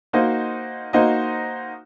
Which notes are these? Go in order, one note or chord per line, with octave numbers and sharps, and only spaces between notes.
A#3 D#4 F#4 C5 D#5
A#3 D#4 F#4 C5 D#5